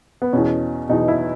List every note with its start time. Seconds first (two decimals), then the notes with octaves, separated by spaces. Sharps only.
0.22 B3
0.33 E2 B2 C#4
0.89 E2 B2 D#4
1.08 E4